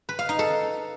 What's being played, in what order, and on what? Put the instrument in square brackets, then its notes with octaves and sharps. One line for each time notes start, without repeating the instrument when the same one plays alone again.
[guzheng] B4
F5
D#4
A4